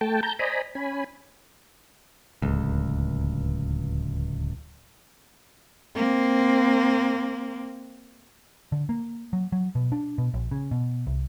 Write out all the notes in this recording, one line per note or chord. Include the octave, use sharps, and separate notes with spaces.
A3 G5 A5
A5 A#5 G6
C5 D5 D#5 G#5 A#5 B5
C#4 G#5 B5
D1 C#2
A#3 C4
D3
A#3
F#3
F#3
B2
D4
B2
A#1
C#3
B2
C2